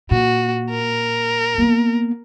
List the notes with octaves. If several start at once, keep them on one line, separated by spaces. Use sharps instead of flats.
A#2 F#4
A#4
A#3 B3